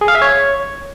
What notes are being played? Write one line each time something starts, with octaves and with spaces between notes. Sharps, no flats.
G#4
F5
E5
C#5